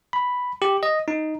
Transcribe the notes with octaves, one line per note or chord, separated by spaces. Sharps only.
B5
G4
D#5
D#4